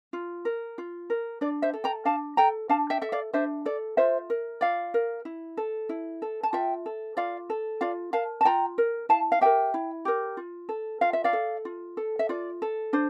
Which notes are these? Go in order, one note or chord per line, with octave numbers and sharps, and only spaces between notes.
F4
A#4
F4
A#4
D4 D5
C5 E5
A4
G5 A#5
D4 F5 A5
A4 G5 A#5
D4 F5 A5
E5 G5
A4 E5
D5 F5
D4 C5 E5
A4 D5
F4 C5 E5
A#4
F4 D5 F5
A#4
E4
A4
E4
A4
A5
F4 E5 G5
A4
F4 D5 F5
A4
F4 D5 F5
A#4 F5 A5
A5
F4 G5 A#5
A#4
E4 F5 A5
F5
G4 A#4 E5 G5
E4
G4 A#4
F4
A4
F4 F5
E5
D5 F5
A4
F4
A4
E5
F4 D5
A4
D4 C5